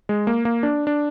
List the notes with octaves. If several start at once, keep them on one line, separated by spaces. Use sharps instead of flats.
G#3
A#3
A#3
D4
D4